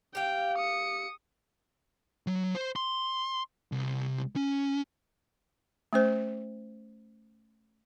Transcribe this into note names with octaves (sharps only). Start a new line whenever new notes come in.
G4 F5 G5
D#6 C#7
F#3
C5
C6
C2
C#4
A3 C#4 C5